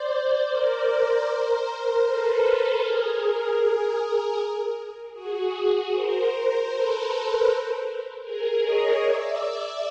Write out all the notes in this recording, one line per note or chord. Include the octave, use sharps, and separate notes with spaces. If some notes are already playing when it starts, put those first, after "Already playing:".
Already playing: C5 D5
A#4 C5
C5 D5
A#4 C5
A4 B4
G#4 A#4
G#4 A#4
F#4 G#4
A#4 C5
A#4 C5
A4 B4
G#4 A#4
C#5 D#5
D5 E5